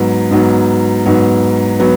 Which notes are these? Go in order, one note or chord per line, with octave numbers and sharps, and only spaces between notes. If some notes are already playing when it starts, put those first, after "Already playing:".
Already playing: G#2 F#3 B3
G#2 F#3 B3
G#2 F#3 B3
F#3 B3